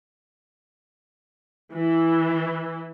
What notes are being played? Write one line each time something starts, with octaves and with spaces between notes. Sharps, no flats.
E3